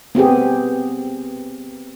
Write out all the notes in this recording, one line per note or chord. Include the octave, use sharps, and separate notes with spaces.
B3 C4 G4 G#4